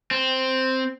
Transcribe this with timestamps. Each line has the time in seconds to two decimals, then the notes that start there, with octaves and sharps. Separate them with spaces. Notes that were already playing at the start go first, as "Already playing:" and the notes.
0.11 C4